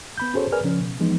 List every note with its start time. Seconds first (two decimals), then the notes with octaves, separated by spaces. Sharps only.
0.18 B3 B5 G6
0.34 C#4 F#4 G#4 A4 C5 C#5
0.52 G#4 A#4 B4 D5 G#5 F6
0.64 C#3 F3 C#4
0.80 B2
1.00 E3 F3 G#3 B3 D#4